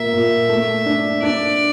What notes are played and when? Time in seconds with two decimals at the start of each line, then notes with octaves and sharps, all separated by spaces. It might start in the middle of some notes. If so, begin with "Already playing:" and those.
Already playing: A#2 A#3 E5
0.13 A#2
0.49 A3
0.86 D4
1.22 D4 D5